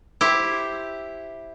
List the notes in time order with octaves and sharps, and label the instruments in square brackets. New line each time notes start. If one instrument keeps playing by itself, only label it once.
[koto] E4 G4 C5